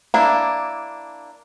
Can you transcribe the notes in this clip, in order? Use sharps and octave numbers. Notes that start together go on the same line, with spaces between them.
A#3 D4 E4